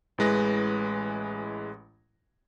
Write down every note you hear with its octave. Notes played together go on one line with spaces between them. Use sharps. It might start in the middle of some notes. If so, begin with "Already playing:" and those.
A1 E3 G#3 B4 A#6